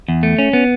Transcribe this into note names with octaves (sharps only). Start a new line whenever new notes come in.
E2
A3
C#4
B3